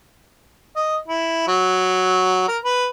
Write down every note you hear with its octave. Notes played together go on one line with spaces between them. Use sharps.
D#5
E4
F#3
A#4
B4